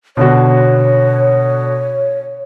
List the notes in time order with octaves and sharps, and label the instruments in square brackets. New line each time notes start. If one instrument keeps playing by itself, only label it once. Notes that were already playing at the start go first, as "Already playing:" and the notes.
[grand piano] B2 D3 F#4 [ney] C#5